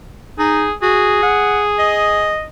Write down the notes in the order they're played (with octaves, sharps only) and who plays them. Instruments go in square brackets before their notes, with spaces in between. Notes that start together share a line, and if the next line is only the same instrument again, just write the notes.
[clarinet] D#4 [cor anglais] G#4
[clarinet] F#4 [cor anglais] G#4
[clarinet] F#5
D#5